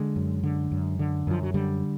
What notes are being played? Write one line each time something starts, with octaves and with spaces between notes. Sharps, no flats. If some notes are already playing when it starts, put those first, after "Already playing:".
Already playing: D3 G#3
F#2
D3
F#2
D3
F#2 F3
F#3
D3 G3